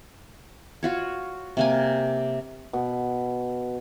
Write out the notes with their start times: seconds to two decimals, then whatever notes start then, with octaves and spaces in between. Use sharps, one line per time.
0.83 F4 F#4 C#5
1.57 C3 A#3 G#5
2.73 B2